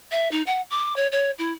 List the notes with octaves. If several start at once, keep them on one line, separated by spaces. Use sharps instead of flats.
E5
D#4
F#5
D6
C#5
C#5
E4